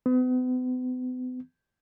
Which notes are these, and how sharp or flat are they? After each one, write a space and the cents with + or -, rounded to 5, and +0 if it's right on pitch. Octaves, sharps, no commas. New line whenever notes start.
B3 +40